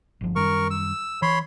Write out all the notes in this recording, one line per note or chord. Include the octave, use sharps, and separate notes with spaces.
G1 F3
F#2 D#3 G3 A#4 C#6
E6
E3 C#5 B5 C6